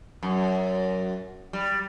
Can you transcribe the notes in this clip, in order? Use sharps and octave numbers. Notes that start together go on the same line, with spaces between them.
F#2
G3